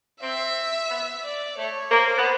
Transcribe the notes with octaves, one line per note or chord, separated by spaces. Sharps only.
C4 E5
B3
D5
A3 C#5
A#3 C5
B3